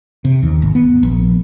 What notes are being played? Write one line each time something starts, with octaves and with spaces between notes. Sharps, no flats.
C3
D#2
G#1
B3
A#1